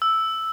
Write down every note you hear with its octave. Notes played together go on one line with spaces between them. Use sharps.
E6